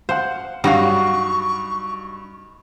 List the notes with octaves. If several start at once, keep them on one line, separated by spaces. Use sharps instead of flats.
C5 F5 F#5
G2 F#3 G3 D#4 F#4 F5 F#5 C#6